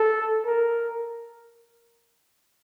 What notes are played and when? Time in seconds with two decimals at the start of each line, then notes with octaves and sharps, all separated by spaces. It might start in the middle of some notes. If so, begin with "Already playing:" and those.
Already playing: A4
0.46 A#4